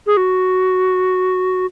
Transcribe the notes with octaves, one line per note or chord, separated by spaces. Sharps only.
G#4
F#4